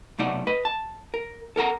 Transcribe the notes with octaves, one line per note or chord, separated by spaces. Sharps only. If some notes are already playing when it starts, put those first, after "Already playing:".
B1 C3 A3 D#4 D5 F#5
B4 D#5
A5
A#4
A4 A#4 F#5 A#5